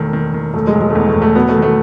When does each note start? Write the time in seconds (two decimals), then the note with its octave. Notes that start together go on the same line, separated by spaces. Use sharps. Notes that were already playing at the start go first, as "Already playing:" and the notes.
Already playing: E1 D#3 A3
0.13 D#3
0.34 D#3
0.54 E1 A3
0.67 G#3
0.75 E1
0.81 G#3
0.90 A3
0.95 E2 B3
1.08 A3
1.15 E1
1.22 A3
1.35 F#3 B3
1.49 A3
1.56 D#3
1.62 A3